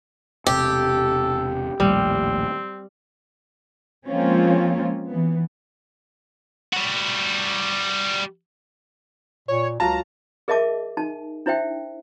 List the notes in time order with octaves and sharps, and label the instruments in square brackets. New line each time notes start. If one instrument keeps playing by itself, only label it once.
[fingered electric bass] E1 C3 [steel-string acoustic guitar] G4 [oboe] A4
[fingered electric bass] A#1 D#2 A2 [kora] G3 [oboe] C4
[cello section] F3 G#3 A#3 C4 C#4 F4
E3 B3
[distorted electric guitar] G3 F#4
[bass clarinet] A#2 [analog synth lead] C#5
[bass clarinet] C#2 [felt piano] F#3 F4 A5 [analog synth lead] A#5
[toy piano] G#4 A#4 D#5 E5 A5 D6
D#4 A5
D4 E4 C5 E5 G5